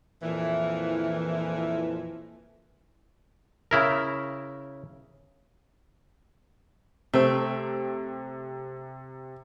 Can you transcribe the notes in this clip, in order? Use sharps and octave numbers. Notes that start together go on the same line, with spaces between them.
F2 A#2 E3
C#3 E4 A#4
C3 A3 C4